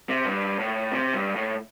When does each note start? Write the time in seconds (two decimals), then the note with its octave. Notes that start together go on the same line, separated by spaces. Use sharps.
0.09 C3
0.25 G2
0.59 A2
0.92 C3
1.14 G2
1.36 A2